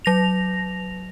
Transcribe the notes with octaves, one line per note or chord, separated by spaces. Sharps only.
F#3 A#6 F7